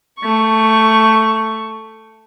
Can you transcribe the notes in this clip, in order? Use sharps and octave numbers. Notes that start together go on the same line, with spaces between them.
A3 C#6